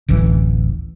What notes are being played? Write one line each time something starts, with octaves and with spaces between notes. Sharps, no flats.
D1 A1 E3